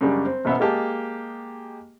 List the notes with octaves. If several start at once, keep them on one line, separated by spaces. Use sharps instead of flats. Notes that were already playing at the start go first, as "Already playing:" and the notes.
F#2 C#3 G3 G#3 D4
C4
A1 B2 B3 C5 E5
G#3 A#3 G4 D#5 A5